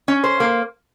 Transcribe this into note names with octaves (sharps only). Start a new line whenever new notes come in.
C#4
C5
A#3